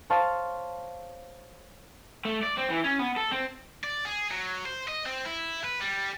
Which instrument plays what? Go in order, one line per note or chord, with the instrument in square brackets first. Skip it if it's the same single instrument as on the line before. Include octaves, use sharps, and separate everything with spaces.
[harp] C5 C#5 F5 A5
[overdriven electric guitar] A3
D5
C4
E3
C#4
B3
A4
C4
[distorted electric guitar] D5
G#4
F#3
C5
D#5
C4
E4
B4
G3